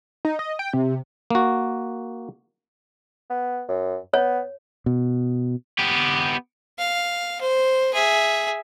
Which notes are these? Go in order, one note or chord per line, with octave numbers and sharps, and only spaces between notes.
D#4
D#5
G5
C3
A#3 F#4
B3
F#2
B3 C#5
B2
B3 G4
F5
C5
G#4 E5